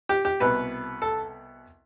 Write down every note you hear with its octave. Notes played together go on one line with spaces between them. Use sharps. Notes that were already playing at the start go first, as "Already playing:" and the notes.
G4
G4
C2 B2 B3 B4
A4